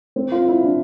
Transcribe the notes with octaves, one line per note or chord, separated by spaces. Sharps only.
C4
F4
E4
D4